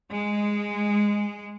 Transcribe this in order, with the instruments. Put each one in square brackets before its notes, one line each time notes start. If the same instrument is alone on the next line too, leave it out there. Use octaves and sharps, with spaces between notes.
[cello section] G#3